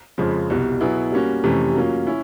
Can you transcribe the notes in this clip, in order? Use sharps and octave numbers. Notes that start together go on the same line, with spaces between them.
F2 C#3 F3 G#3
C2 B2 G3
B2 F#3 B3 E4 G#4
G3 A#3 C#4 F#4
F2 C3 E3 A3 C#4
F#3 A#3 C#4 F4
C#4 E4